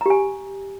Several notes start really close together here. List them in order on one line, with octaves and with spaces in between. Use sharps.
A#5 G4 G#5